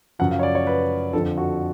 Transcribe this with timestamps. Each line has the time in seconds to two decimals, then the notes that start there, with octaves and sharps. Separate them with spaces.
0.19 F#2 C#3 F3 F#5
0.31 F5
0.39 C#5
0.43 D5
0.55 C#5
0.67 B4
1.13 F2 D3 F3 A4
1.38 F#4